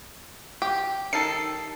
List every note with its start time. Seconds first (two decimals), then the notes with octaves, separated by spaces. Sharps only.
0.62 G4
1.13 D#3 D#4 A4 C7